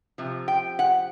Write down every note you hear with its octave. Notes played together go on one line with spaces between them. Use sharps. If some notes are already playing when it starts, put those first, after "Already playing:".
C3 F3
G5
F#5